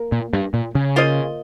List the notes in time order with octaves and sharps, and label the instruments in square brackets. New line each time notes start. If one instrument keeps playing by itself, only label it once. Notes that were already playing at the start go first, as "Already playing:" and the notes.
Already playing: [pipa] A#3 A#4
[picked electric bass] A#2
G2
A#2
C#3
[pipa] A#3 F4 C5 D#5